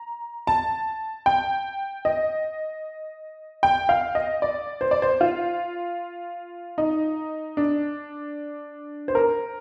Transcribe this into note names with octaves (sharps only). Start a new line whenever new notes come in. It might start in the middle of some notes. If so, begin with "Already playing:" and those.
Already playing: A#5
A5
G5
D#5
G5
F5
D#5
D5
C5
D5
C5
F4
D#4
D4
C5
A#4